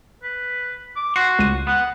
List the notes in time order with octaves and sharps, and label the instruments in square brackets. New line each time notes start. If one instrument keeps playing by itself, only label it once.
[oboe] B4
D6
[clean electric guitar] F#4 [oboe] C6 [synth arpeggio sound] C7
[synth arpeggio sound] C#2 D#7
[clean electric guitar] B3 [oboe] F#5